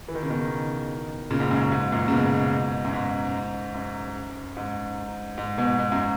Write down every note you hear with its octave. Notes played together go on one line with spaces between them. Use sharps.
E3
D#3
C#3
B2 D#3
A#2 C#3
G#2
F#2
F#2
G#2
F#2 A#2
C#3
G#2 B2
F#2
G#2
F#2
G#2
G#2
G#2 B2
G#2
F#2